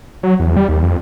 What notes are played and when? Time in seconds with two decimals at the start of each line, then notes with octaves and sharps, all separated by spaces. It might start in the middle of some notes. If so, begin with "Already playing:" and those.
0.23 F#3
0.40 E2
0.56 G3
0.69 D#2
0.82 F2